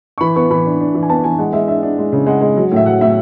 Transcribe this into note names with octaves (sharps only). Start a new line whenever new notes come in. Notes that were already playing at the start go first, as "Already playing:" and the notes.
C#6
E3 B5
B3 C#6
E3 B5
D4
D4
E3
G#5
B3 A5
E3 G#5
G#3 F#5
G#3 E5
D4 E5
D4
G#3
C#3
G#3 F#5
G#3
F#3
A2 E5
F#3 F#5
A2 E5